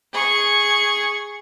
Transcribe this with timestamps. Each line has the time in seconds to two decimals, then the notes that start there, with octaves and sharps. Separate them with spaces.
0.13 G#4 C#6